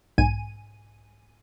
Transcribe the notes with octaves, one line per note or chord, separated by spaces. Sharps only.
B1 G#2 G#5 D#7